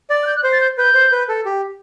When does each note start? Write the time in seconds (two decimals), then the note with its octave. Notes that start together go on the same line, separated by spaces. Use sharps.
0.10 D5 A6
0.23 F#6
0.27 G6
0.36 F#6
0.44 C5 G6
0.53 A6
0.61 G6
0.78 B4 G6
0.95 C5
1.12 B4
1.29 A4
1.46 G4